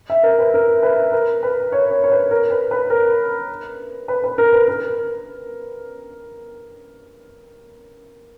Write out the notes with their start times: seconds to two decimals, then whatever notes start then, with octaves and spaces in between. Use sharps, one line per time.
0.10 E5
0.23 A#4
0.39 B4
0.54 A#4
0.83 B4
1.12 A#4
1.43 B4
1.72 C#5
1.91 C#5
2.04 C#5
2.12 B4
2.31 A#4
2.50 B4
2.71 B4
2.90 A#4
4.08 B4
4.24 B4
4.38 A#4
4.53 B4
4.68 A#4